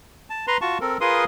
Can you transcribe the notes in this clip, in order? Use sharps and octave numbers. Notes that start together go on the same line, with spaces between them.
A5
B4 A#5 C6
F4 F#4 A5 C#6
C4 A4 A#4
F4 G#4 A#4 B4 C6 D#6